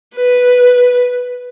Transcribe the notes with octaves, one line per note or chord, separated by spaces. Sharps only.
B4